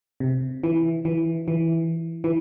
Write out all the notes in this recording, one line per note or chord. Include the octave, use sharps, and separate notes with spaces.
C3
E3
E3
E3
E3